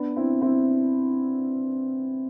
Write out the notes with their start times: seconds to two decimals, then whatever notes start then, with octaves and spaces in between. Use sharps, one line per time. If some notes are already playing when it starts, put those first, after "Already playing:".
Already playing: B3 D4
0.16 C4 E4
0.42 C4 E4